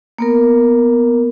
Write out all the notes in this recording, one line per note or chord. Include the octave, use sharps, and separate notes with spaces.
A#3 B3 A#4